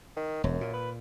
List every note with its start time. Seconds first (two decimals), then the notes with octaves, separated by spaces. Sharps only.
0.17 D#3
0.44 E1 F#2
0.61 A#2
0.73 B4